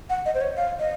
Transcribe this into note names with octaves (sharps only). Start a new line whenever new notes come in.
F#5
D#5
C5
C#5
F5
D#5